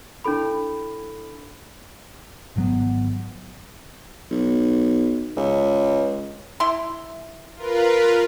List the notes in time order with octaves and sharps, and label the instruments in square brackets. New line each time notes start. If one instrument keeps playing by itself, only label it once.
[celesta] D4 E4 A4 B5
[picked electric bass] G#1 F#3 B3
[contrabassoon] B1
C#2
[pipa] E4 C6
[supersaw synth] F4 A#4 B4